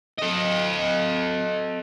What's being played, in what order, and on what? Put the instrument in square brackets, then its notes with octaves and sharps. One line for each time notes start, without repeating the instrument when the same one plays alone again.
[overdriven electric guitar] A4 D#5